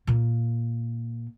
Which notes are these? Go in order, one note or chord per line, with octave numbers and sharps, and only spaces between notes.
A#2 A#3